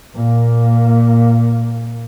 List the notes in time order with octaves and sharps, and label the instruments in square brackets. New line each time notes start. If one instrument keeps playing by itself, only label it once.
[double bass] A#2 A#3